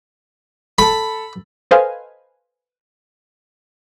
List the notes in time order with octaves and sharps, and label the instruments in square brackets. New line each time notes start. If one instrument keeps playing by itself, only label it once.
[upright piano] A4 A5 [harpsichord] B5
[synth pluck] A4 B4 C5 D#5 F5 G#5